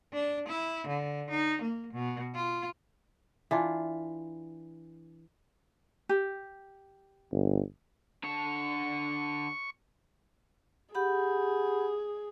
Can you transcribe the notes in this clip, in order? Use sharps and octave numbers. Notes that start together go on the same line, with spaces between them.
D4
E4
D3
D#4
A#3
B2
F4
E3 D4 F4
G4
G1
D3 A5 C#6
G4 G#4 F#5 B5